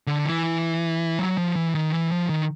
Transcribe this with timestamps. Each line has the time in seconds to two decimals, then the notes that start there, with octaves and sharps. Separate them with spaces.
0.07 D3
0.25 E3
1.19 F#3
1.38 F3
1.56 E3
1.75 D#3
1.93 E3
2.11 F3
2.30 D#3